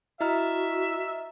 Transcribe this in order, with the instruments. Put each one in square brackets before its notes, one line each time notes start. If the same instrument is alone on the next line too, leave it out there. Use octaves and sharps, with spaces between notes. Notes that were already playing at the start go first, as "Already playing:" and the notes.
[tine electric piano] E4 [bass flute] F#4 [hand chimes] D#5 A#5 F6 [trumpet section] E5